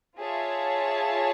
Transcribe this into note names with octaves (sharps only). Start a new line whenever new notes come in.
F4 G#4 C#5 E5 A5